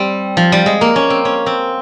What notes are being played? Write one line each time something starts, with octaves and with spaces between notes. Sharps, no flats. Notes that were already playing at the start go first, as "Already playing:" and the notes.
Already playing: G3 C4
F3
G3
G#3
A#3
C#4
C4
C#4
C4